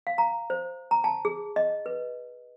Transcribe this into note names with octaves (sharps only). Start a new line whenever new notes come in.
F5
A#5
C5
A#5
A5
G#4
D#5
B4